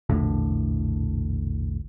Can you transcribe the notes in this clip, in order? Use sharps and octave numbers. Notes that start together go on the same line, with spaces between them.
E1 A#1 A2 D3